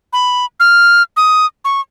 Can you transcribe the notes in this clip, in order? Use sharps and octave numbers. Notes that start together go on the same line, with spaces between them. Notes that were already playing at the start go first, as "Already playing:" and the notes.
B5
F6
D#6
C#6